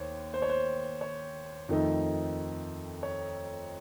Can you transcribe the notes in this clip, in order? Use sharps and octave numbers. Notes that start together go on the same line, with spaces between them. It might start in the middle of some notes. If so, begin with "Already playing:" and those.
Already playing: D#2 C5 C#5
C5
C#5
C5
C#5
F2 D#3 A3 D#4
C#5